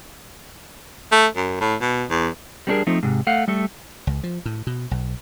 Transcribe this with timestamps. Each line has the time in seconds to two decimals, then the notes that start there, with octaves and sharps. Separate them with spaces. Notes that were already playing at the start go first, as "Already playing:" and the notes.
1.12 A3
1.36 F#2
1.60 A2
1.81 B2
2.10 E2
2.67 G3 A#3 C#4 D4 G#4 A#4
2.87 F3 A3 C4 D#4
3.03 G#2 C3
3.27 A3 F5 F#5
3.48 G3 A3 A4
4.07 C#2
4.23 F3
4.45 A2
4.67 B2
4.91 B1